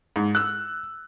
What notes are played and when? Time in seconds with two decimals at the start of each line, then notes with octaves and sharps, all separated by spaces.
0.16 G#2
0.35 E6 F#6